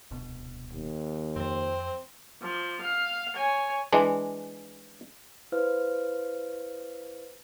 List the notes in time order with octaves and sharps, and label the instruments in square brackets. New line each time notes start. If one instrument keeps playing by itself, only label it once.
[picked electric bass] D1 C2 B2
[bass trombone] D#2
[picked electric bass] F2 F3 [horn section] C4
[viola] F3
F5
C#5 G#5
[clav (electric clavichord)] E3 G#3 D4
[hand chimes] E4 B4 C5 F5 F6